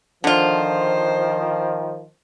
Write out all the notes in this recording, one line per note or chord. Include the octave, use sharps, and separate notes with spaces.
D3 D#3 F3 F4 C5